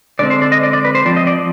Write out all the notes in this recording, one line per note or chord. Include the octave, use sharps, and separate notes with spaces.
D3 G#3 C4 D5
C5
D5
D#5
D5
D5
B4
C5
F3 C4 D5
D#5
D5